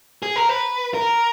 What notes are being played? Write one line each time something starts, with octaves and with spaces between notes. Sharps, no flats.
G#4
A#4
B4
A#4